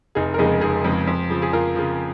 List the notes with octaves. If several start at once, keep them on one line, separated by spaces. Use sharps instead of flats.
F1 D#4 G#4
A#4
F2 C#3 G#3 D#4 G#4
F1 D#4 G#4
F2 C#3 G#3
F2
C#3 F3
G#4
F2 F4 A#4
C#3 F3